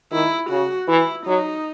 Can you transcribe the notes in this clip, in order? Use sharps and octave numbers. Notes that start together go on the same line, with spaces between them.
D#3 E4
C#3 F#4
E3 E4
F#3 D#4